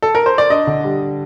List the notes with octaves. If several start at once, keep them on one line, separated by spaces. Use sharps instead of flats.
A4
A#4
C5
D5
D4 D#5
D3
G3